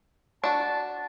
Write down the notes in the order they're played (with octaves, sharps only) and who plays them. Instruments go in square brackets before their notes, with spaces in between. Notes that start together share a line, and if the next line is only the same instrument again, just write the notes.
[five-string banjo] D4 F#4 [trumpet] A5